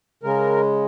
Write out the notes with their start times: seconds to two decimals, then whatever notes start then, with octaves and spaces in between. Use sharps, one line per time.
0.23 C#3 G#3 A#4